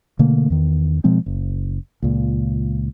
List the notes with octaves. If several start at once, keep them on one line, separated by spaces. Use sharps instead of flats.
B2 D3 A3 A#3
E2 D#3
B2 F3 G#3 C4
F#1
C#2 A#2